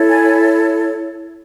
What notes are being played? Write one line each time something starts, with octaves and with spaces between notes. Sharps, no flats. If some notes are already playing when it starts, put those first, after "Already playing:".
Already playing: E4 A4 C#5
G#5